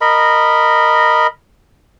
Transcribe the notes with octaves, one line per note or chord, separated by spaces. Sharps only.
A#4 D#5 B5